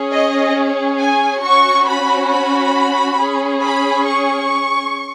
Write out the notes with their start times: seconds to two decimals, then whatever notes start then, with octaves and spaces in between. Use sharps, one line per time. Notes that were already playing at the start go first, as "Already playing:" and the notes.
Already playing: C#4 G#4
0.13 D#5
1.01 G#5
1.44 C#4 F#4 C#6
1.88 B5
2.32 B5
3.18 C#4 G#4
3.63 B5
4.06 C#6